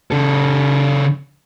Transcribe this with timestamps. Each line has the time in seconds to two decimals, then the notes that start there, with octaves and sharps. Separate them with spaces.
0.12 C#3 A4